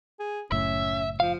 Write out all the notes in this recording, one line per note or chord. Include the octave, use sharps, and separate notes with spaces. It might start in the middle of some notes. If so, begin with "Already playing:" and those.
G#4
F#1 A2 C#4 E5
F3 F5